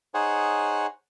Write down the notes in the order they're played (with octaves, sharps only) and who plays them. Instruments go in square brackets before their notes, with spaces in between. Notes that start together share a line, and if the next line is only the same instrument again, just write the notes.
[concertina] D#4 G#4 C5 C#5 F#5 G#5